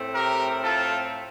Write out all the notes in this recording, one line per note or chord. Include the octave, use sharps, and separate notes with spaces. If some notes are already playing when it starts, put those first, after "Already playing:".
Already playing: A2 A3 C4
G4 A#4
F4 A4